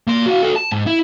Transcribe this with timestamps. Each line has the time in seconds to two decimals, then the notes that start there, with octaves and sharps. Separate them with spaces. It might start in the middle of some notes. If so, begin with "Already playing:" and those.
0.07 A#3 C6
0.26 F#4 F5
0.42 F#4 A4
0.56 A5
0.72 G#2
0.87 E4